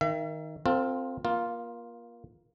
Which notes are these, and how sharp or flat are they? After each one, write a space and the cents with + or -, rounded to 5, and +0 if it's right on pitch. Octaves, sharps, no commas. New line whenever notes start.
D#3 +10 E5 +40
C4 +0 F4 +15 A4 +40
A#3 +25 F4 +0